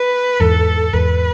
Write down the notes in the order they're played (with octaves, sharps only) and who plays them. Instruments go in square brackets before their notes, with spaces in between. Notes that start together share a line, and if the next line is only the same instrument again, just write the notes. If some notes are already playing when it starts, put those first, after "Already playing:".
Already playing: [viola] B4
[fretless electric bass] E2 G#2 [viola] A4
[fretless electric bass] E2 G#2 [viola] B4